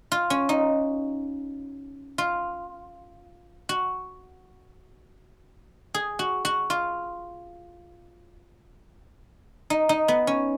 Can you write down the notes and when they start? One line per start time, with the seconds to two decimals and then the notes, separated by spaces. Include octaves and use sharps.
0.12 F4
0.30 C#4
0.49 D#4
2.18 F4
3.69 F#4
5.94 G#4
6.19 F#4
6.45 F#4
6.70 F4
9.70 D#4
9.89 D#4
10.08 B3
10.27 C#4